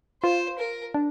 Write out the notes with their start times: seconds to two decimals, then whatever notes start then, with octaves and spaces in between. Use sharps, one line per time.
0.23 F4 C5
0.59 A#4
0.94 D4